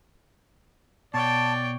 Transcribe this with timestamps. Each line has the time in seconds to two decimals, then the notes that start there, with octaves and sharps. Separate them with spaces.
1.14 B2 C#5 D5 G5 A5